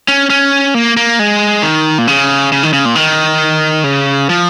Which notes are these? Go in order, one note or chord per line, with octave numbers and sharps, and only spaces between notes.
C#4
C#4
A#3
A#3
G#3
D#3
A#2
C#3
C#3
D#3
C#3
A#2
D#3
C#3
F3